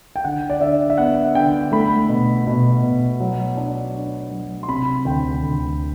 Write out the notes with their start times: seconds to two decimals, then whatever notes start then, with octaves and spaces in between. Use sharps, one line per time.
0.16 G5
0.24 D3 F#5
0.50 D5
0.61 D3 E5
0.90 E5
0.98 B3 F#5
1.35 D3 G5
1.72 A3 B5
2.09 B2
2.47 B2
2.83 B2
3.20 F#3
3.57 D4
3.95 D4
4.31 F#3
4.63 C6
4.68 C3 B5
5.05 D2 G5
5.42 D2